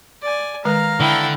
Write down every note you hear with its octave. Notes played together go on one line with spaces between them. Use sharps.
D5 G#5
D#3 G#3 B4 F5 A#5
D3 E4 G5